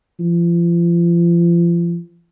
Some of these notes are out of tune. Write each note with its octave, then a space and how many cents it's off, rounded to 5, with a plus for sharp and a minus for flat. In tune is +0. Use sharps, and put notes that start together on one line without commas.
F3 -35